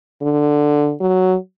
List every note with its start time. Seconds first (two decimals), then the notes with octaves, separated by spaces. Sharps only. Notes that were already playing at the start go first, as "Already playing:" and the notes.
0.22 D3
1.00 F#3